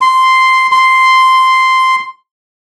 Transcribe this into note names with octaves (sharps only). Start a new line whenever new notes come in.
C6
C6